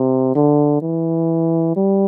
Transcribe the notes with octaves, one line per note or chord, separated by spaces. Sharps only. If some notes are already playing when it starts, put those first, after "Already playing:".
Already playing: C3
D3
E3
G3